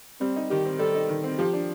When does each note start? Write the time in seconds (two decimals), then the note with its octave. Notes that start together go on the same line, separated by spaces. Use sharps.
0.21 G3 C4
0.36 D#4
0.50 D#3 G4
0.66 C4
0.79 G3 A4
0.95 D#4
1.09 D#3
1.24 C4
1.38 F3 G4
1.53 D4